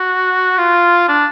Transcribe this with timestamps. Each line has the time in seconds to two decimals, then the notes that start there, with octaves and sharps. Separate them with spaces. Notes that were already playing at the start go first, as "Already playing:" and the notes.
Already playing: F#4
0.58 F4
1.08 D4